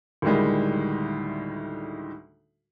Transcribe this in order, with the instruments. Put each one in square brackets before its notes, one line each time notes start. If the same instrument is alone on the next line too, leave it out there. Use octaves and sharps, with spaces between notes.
[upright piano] D2 A2 D#3 G3 G#3